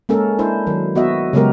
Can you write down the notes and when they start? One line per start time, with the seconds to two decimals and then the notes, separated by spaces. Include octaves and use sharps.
0.09 G#3 A#3 C#4 A4 A#4
0.39 D4 E4 C5
0.67 D#3 F#3
0.95 B3 F#4 D#5 E5
1.33 C#3 F#3 G#3 B3 G4 A#4